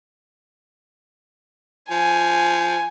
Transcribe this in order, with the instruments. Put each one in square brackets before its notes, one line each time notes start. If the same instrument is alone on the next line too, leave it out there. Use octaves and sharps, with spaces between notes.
[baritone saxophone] F3 [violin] G#5